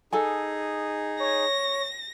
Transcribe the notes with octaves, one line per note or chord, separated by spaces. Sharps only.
D#4 G#4 A4 G#5
C#5 A#6